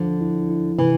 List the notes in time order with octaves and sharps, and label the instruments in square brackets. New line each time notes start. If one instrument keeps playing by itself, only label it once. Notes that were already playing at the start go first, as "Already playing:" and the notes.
Already playing: [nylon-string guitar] D3 [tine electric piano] F3
[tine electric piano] E4
E4
[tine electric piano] C3 [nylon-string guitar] E3